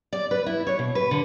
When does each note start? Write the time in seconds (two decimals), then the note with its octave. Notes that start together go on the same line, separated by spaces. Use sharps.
0.13 D5
0.31 B4
0.46 E4
0.67 C#5
0.79 B2
0.95 B4
1.11 D3